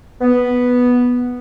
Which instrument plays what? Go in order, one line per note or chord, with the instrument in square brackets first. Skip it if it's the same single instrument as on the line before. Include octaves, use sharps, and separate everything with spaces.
[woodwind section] B3